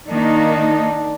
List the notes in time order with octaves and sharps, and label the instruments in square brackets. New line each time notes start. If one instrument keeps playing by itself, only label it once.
[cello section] D#3 A#3 D#4 [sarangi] D4